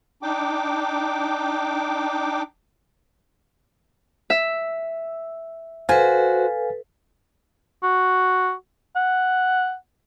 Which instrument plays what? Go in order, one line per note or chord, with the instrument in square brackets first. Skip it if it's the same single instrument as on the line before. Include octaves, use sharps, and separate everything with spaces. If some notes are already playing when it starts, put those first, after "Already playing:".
[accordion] D4 D#4 G5 D6
[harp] E5
[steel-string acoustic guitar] F#4 C5 [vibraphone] A4 B4 [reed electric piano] F5 G#5
[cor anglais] F#4
F#5